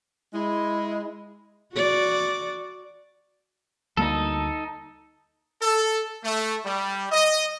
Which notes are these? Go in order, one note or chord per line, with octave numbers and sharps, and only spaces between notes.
G#3 E4
F#4 D5
D2 G3 A#3 D#4 A4
A4
A3
G3
D#5